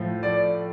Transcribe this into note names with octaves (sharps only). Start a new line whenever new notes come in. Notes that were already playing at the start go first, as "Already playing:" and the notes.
Already playing: A2 F3 A3
D5